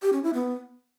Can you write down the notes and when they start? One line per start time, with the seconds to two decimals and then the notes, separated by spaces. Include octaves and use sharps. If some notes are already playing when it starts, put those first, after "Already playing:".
0.02 G4
0.13 C#4
0.23 E4
0.34 B3